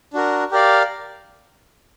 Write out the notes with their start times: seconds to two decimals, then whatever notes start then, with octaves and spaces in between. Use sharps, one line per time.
0.13 D4 F#4 A#4
0.51 G4 A#4 D5 F5